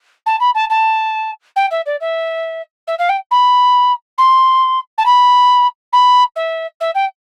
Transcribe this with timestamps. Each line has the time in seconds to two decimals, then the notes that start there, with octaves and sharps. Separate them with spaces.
0.26 A5
0.40 B5
0.55 A5
0.70 A5
1.56 G5
1.71 E5
1.86 D5
2.00 E5
2.87 E5
2.98 F5
3.09 G5
3.31 B5
4.18 C6
4.98 A5
5.05 B5
5.93 B5
6.36 E5
6.80 E5
6.95 G5